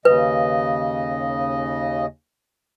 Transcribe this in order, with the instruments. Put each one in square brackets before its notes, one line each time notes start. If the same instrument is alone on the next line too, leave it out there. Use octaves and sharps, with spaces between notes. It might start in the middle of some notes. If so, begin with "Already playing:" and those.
[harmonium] D#2 C#3 D#5 [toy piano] B4